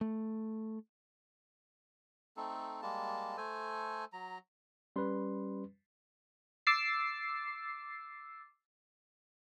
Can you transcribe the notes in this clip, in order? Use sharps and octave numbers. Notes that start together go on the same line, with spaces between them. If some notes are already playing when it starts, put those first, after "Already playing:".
A3
A3 C4 D#4 A4
G3 G#3 A#3 A5
A3 A4 C5 G#5
F#3 A#5
G3 C#4 B4 C6
D6 E6 A6 C7